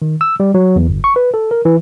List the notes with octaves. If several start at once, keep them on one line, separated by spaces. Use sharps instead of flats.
D#3
E6
G3
F#3
E2
G1
C#6
B4
A4
A#4
E3